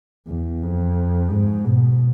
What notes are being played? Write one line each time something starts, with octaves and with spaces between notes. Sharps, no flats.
E2
F2
G#2
B2